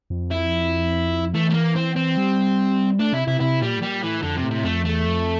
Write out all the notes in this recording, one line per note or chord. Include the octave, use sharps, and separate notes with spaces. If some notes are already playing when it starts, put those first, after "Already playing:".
F2
E4
E3 A3
A3
A#3
C4
C4
G3
A3 D4
C3 E4
C3 E4
C3 E4
A#2 G3
A2
A#2 G3
A2 E3
F2 D3
C3
A2
C3
F2 A3
E2 A3
F2